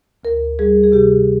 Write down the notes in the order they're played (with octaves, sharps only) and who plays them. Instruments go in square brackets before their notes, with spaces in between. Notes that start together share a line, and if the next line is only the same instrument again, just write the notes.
[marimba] D2 A#4
G3 G#4
G#4
C3 G4